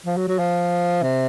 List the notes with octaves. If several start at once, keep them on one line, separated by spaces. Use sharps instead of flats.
F3
F#3
F#3
F3
C3